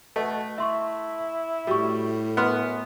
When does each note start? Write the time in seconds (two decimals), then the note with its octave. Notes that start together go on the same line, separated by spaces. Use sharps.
0.16 B2 A3
0.58 E4 E5 C6 C#6
1.67 A2 G3 F#4 C#6
2.37 F#2 B3 C6 F6 F#6